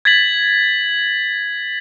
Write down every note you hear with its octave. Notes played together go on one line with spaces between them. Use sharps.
G#6 A6 B6 F#7